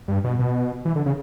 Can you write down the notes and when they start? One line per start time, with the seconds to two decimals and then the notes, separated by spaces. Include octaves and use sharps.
0.08 G2
0.24 B2
0.39 B2
0.85 E3
0.95 D3
1.06 C#3